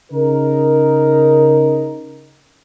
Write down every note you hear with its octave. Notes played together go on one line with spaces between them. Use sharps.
C#3 D#4 A#4